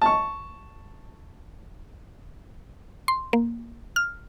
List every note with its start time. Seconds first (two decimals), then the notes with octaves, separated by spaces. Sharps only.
0.02 A5 C#6
3.08 C6
3.33 A#3
3.96 F6